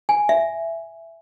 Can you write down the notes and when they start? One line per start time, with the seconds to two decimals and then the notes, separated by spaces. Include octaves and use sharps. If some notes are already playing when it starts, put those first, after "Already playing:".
0.09 G#5
0.29 E5